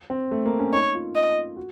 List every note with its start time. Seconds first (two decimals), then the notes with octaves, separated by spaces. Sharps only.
0.10 C4
0.31 A3
0.46 A#3
0.59 C#4
0.73 D#4 C#5
0.95 F4
1.15 D#5
1.57 F#4